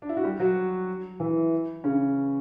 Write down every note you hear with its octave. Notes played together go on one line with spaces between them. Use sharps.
D4
E4
F#4
G3 G4
F#3 F#4
E3 E4
C#3 C#4